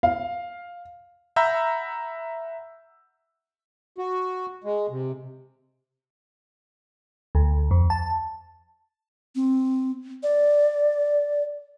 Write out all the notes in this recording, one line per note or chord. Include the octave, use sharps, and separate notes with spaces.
F5
E5 F#5 A#5 B5 E6 G6
F#4
G#3
C3
D2
F2
A5
C4
D5